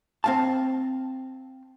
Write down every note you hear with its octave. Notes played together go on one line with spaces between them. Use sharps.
C4 F5 A5